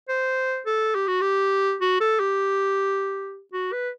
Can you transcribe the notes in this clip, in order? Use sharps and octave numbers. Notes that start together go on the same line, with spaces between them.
C5
A4
G4
F#4
G4
F#4
A4
G4
F#4
B4